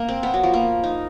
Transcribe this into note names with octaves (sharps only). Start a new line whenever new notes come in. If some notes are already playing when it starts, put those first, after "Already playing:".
Already playing: A#3
C4
B3
F#3
F3
A#3
D#4